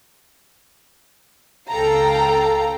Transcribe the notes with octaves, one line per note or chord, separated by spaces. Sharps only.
C#2 A4 F5 G5 A#5